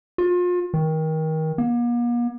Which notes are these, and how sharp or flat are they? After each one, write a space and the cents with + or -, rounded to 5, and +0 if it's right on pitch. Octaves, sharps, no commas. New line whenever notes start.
F4 +35
D#3 +25
A#3 +45